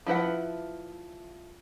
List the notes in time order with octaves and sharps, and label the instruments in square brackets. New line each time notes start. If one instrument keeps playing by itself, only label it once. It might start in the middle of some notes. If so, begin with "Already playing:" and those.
[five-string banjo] F3 E4 B4 F#5